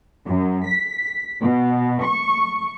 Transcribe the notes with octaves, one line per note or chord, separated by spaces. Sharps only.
F#2
B6
B2
C#6